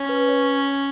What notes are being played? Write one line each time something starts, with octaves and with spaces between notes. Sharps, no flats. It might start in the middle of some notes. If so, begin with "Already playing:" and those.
Already playing: C#4
B4
C#5